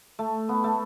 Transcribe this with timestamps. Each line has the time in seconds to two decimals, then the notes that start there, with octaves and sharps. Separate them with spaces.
0.19 A3
0.49 B3
0.64 A3